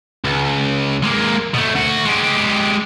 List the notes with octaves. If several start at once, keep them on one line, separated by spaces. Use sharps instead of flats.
C#2
G#3 A#3
B2 A3
D2 F#4
G#3 G4